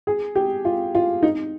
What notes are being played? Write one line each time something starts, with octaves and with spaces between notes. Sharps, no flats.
G#4
G4
F4
F4
D#4